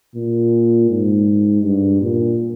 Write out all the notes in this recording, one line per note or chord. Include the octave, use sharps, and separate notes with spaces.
A#2
G#2
G2
A#2